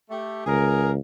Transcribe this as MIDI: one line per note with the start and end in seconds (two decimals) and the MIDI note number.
0.10 0.45 57
0.10 0.45 67
0.46 0.98 37
0.46 0.90 68
0.46 0.90 70